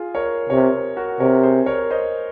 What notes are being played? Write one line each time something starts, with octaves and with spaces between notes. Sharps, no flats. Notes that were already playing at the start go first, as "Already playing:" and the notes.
Already playing: F4 G#4
A#4 C#5
C3 A#4 C#5
F#4 A#4
C3 A#4 C#5
G#4 C5
A#4 C#5
C5 D#5